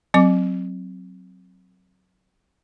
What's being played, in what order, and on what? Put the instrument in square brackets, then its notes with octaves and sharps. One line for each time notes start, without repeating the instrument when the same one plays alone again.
[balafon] F#3 C4 D6